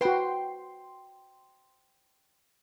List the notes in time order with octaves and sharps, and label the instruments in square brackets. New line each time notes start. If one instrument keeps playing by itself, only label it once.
[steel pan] F#4 B4 [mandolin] C5 G5 C6